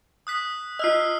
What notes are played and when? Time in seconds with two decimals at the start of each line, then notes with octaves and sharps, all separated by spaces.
0.27 D#6 F#6 B6
0.79 F4 D#5 E6 F6 C7